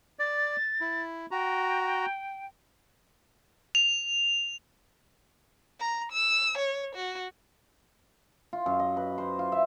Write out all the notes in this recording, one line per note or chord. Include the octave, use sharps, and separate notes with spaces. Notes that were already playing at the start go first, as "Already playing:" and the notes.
D5 A6
E4
F#4 G5 A#5
F7
A#5
E6
C#5
F#4
F4
F#2
D#5
B4
C5
F4
E5